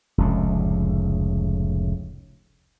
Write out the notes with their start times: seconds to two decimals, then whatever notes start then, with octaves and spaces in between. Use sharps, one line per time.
0.18 F1 C#2 A2